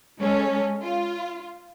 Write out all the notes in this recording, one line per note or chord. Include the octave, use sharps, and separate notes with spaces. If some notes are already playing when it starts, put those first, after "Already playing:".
G#3 C#4 A4
F4